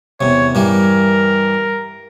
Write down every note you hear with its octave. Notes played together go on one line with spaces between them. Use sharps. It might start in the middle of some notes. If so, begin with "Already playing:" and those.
E2 C3 C#5
G2 E3 G3 A#4